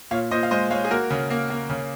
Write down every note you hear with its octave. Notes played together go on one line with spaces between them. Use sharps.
A#2 C#5 F5
A#2 C5 D#5
F5
G#3 C5 D#5
G#3 C#5 F5
G#4
A#3 F#4 A#4
C#3
A#3
A#3
C#3